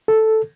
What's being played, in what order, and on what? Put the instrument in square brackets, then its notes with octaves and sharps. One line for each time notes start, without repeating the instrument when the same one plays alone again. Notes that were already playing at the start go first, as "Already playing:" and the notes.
[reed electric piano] A4